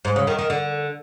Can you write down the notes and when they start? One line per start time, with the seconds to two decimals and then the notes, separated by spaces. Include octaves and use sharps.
0.05 G#2
0.16 C#3
0.27 D#3
0.39 D#3
0.50 D3